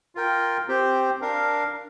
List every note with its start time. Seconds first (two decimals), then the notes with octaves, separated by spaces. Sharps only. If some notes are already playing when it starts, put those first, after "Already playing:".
0.15 F4 A#4 G5
0.68 C4 G4 C5
1.21 D4 A#4 F5